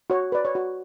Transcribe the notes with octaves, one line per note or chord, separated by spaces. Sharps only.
F#4 C#5
B4 D5
C#5
F#4